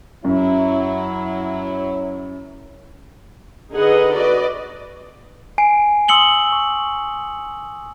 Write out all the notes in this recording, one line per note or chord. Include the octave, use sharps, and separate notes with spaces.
F#2 F#3 E4
D3 D#4 G#4 B4 D#5 F#5
F#4 B4 D5 D#5
G#5 C7 D7
C6 D#6 E6 C#7 F#7 G7
C#6